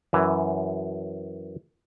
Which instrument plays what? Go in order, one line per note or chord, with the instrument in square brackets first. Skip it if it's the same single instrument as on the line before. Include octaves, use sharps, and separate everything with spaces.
[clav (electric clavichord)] F#2 E3